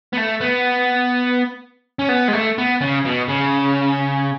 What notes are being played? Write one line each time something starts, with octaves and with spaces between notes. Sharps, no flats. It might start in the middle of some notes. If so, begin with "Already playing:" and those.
B3
A3
B3
C#4
B3
G#3
A3
B3
C#3
B2
C#3